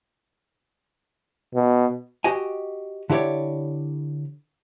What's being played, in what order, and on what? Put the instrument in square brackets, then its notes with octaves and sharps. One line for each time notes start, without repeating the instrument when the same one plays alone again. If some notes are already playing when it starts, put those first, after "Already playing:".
[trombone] B2
[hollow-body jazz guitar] F#4 G4 D#5 G#5
D3 E4 G4 C#5 D5